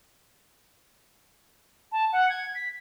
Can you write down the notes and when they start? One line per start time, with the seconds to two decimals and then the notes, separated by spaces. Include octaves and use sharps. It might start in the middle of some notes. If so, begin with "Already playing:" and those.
1.92 A5
2.12 F#5
2.30 G#6
2.55 B6